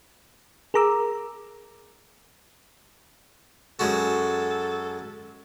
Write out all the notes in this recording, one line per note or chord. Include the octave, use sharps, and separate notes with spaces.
G#4 A#4 A#5 D6 E6
F#2 G#3 F#4 A4